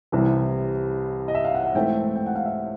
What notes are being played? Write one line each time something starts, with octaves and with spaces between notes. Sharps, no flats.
C2 C3 E3
D#5
E5
F5
F#5
F#5
G#2 E3 A3 C4 G5
G5
F#5
F5
E5